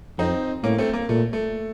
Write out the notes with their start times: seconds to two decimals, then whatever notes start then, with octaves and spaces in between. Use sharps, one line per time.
0.18 F2 C4 D#4
0.63 A2 A#3 C#4
0.78 A3 C4
0.93 A#3
1.09 A#2 A3
1.33 A3